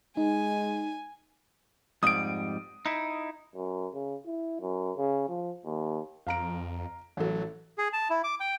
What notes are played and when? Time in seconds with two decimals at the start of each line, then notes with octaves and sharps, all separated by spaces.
0.17 G#3 D#4 G#5
2.03 F2 G#2 G3 D#6 D7
2.86 D#4 E4
3.55 F#2
3.94 C#3
4.26 E4
4.61 F#2
4.97 C#3
5.29 F3
5.65 D#2
6.27 F2 F5 A#5 D7
7.17 A1 F#3 A4
7.78 G#4
7.93 A5
8.10 E4
8.24 D6
8.40 G5